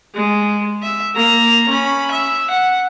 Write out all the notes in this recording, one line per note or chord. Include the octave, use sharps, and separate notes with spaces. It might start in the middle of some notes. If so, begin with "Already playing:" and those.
G#3
E5
A#3 A#5
C#4 B5
E5
F#5